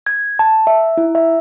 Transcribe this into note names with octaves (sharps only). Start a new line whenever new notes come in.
G#6
A5
E5
E4
E5